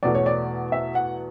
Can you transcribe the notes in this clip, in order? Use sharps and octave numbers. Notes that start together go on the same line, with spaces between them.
E2 B2 A3 D5
C#5
D5
E5
F#5